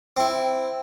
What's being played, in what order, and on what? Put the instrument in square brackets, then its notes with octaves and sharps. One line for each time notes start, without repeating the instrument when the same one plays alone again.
[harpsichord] C4 E4